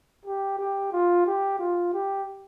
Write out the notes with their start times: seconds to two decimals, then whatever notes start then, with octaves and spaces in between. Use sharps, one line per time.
0.25 G4
0.59 G4
0.93 F4
1.27 G4
1.59 F4
1.93 G4